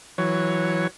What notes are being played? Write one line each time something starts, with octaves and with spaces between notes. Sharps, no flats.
E3 F#3 C#5